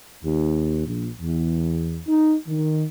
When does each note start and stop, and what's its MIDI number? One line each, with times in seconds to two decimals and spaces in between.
0.23 0.86 39
0.87 1.08 34
1.21 1.98 40
2.07 2.35 63
2.47 2.84 51